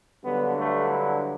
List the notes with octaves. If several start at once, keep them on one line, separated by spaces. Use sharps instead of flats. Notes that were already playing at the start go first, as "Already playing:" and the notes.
G2 D3 F#3 B3
A3
E4